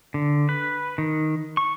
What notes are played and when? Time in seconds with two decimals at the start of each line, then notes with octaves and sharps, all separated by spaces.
0.14 D3
0.49 B4
0.98 D#3
1.57 C#6